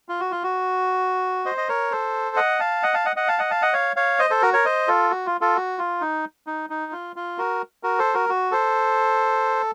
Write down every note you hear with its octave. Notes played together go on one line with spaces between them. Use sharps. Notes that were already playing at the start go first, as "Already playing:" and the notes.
F4
F#4
F4
F#4
C5 D#5
D#5
A#4 C#5
A4 C5
D#5 F#5
F5 A5
D#5 F#5
F5 A5
D#5 F#5
D#5 F#5
F5 A5
D#5 F#5
F5 A5
D#5 F#5
C#5 F5
C#5 F5
C5 D#5
A4 C5
F#4 A#4
A#4 C#5
C5 D#5
F4 A4
F#4
F4
F4 A4
F#4
F4
D#4
D#4
D#4
F4
F4
F#4 A#4
F#4 A#4
A4 C5
F#4 A#4
F#4
A4 C5